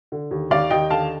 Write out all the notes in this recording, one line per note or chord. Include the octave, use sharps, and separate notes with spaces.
D3
D#2
D#2 D5 F5
D#2 D#5 G5
D3 F5 A5